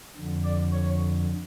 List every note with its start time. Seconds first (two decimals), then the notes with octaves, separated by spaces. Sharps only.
0.17 F2 D3
0.44 D5
0.73 C#5